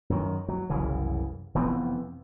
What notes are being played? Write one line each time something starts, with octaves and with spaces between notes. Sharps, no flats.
F#2 D#3
F#3
F#1 C2 C#3 E3
F1 E3 B3 C4